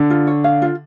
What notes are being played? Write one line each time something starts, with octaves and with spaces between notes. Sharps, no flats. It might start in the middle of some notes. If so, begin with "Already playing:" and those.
Already playing: D3
F4
C#5
F5
F4